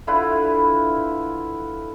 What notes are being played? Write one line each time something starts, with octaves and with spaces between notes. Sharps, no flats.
D3 E4 F4 B4